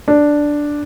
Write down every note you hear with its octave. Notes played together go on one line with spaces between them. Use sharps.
D4